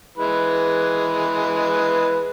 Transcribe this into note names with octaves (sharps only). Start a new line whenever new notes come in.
E3 G#3 B4